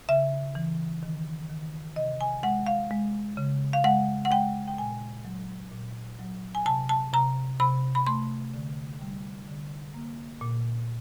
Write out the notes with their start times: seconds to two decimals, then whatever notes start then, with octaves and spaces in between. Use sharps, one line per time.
0.09 C#3 E5
0.55 E3
1.03 D#3
1.49 D#3
1.96 C3 D#5
2.21 G#5
2.43 G#3 F#5
2.67 F5
2.91 G#3
3.37 C#3
3.73 F5
3.84 G#3 F#5
4.25 F#5
4.31 G#3 G5
4.67 G5
4.78 A#2 G#5
5.25 F#3
5.72 A#2
6.19 F#3
6.55 G#5
6.66 C3 A5
6.89 A5
7.13 C3 A#5
7.60 C3 B5
7.95 B5
8.06 A3 C6
8.54 D3
9.01 G3
9.48 D3
9.94 A#3
10.41 A#2